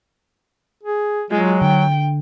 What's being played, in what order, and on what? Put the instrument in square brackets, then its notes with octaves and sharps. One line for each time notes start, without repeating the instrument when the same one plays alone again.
[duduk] G#4
[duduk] F#3 [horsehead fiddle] G#3 F4
[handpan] D3 [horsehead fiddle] G5